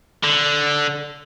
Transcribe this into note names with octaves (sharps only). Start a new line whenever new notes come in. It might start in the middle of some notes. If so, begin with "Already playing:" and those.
D3